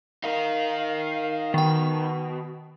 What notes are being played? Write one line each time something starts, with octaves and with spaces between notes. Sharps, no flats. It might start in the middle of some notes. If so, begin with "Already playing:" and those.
D#4 A#4 F5
B2 D#3 G5